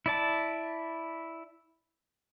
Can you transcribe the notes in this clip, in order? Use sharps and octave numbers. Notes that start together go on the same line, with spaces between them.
E4 D5 A5